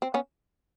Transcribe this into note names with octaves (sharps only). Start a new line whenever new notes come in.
C4
B3 C#4